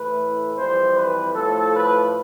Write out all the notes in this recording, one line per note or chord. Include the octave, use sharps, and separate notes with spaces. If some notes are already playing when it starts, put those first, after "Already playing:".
Already playing: A2 E3 A3 B4
F2 E3 G3 C5
B4
A2 F3 A3 A4
B4